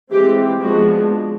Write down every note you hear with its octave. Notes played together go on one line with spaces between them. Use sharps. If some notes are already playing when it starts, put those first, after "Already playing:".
E3 G#3 C4 G4
F3 G#3 B3 D4 F#4